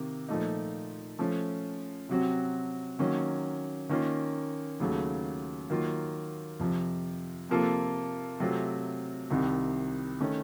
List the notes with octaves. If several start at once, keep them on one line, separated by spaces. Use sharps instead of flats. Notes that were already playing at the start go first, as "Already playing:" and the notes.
Already playing: C3 D#3 A#3
A#2 F3 A3 D#4
F3 A3 C#4
C3 F#3 C4 F#4
D#3 F#3 A#3 C#4
D#3 A#3 C#4 F4
D#2 C#3 F#3 A3
D#3 F#3 A#3 F4
F2 C3 F3
C3 F3 A#3 F4 A4
C3 F#3 A3 C4 F4
C2 C3 D#3
D#3 A3 C#4